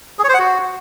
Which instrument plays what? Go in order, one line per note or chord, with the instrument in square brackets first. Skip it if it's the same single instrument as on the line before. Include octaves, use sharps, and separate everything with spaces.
[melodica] G#4
C#5
C5
F#5
F#4